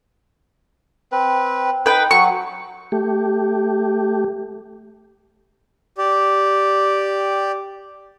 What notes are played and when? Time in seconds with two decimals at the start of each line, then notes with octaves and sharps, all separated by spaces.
1.12 C4 B4
1.86 D#4 B4 G5
2.11 F#3 C#6
2.92 A3 G4
5.98 G4 D5